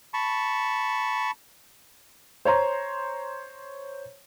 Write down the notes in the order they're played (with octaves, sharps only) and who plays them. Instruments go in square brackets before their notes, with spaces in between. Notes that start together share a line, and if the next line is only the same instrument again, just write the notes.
[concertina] A5 B5 C#6
[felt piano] C5 C#5 A#5 C6